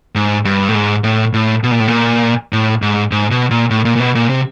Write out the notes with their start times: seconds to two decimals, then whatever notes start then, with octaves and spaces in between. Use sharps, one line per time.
0.15 G#2
0.45 G2
0.69 A2
0.75 G#2
1.04 A2
1.33 A2
1.63 B2
1.71 A#2
1.80 A2
1.88 A#2
2.53 A2
2.82 G#2
3.11 G#2
3.31 B2
3.50 A#2
3.70 A2
3.85 A#2
3.96 A#2
4.00 B2
4.15 A#2
4.29 C3